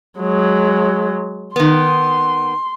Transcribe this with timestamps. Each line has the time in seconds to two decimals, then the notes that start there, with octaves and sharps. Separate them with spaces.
0.19 F#3 G#3
1.56 D#3 B3 C6